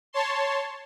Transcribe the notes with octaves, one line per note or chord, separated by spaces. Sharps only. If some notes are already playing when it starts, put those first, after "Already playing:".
C#5 A5 C6